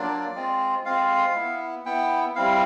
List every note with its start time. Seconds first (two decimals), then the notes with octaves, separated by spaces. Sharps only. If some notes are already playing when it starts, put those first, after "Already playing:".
Already playing: F#3 A#3 D4 F4 D5
0.35 G#3 C4 F4
0.85 G#3 C4 F4 F5
1.35 B3 E4
1.85 B3 E4 G5
2.36 G3 C4 E4 F5